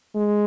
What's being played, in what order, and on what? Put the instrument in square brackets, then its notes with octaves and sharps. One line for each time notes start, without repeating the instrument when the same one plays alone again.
[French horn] G#3